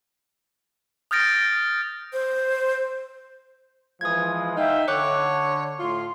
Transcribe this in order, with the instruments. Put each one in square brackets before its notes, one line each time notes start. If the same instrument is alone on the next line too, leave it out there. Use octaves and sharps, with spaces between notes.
[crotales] D#6 F6 G6 A6 A#6 D7
[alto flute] C5
[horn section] E3 F3 G#3 [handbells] D#6 G#6
[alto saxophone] D#4 [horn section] E5 F5 G5
[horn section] D3 [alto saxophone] C#5 [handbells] C#6 D6 F#6
[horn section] A2 C6 [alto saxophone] F4